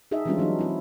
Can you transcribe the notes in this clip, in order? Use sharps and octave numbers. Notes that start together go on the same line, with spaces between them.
D#4 G#4 A4 D#5 E5
E3 G3 G#3 C#4 D4 F4
E3 F#3 B3 D4 D#4
C4 E4